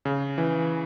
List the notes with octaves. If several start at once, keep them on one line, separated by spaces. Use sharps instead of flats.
C#3
E3